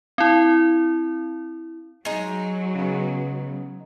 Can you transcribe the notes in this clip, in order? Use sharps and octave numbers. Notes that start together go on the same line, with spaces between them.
C4 E4
F#3 G#3 D#4
C#3 B3